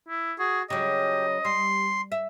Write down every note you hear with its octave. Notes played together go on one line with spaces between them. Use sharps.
E4
F#4 G#4
C#3 F#3 G4 D#5
G3 C6
E5